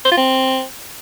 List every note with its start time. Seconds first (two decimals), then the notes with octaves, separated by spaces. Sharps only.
0.05 C5
0.11 F4
0.17 C4